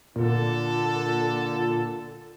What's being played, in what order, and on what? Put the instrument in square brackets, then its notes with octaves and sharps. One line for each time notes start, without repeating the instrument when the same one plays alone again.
[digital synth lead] A#2 [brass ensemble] D3 A4